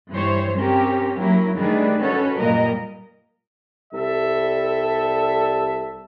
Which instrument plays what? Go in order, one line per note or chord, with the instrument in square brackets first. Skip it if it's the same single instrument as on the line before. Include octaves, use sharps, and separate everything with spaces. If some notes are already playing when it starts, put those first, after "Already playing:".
[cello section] G2 E3 G3 C5 C#5
C4 C#4 G4 A#4
F#3 A#3 C#4 E4 A#4
D#3 G3 A3 D4 G#4 B4
C#4 F#4 A4 B4 C#5
F#2 A#2 G3 A#4 D#5
[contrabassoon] C2 [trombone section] G3 A4 [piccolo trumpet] E5